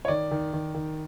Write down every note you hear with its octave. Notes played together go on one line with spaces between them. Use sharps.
C#5
D#3 D5
D#3
D#3
D#3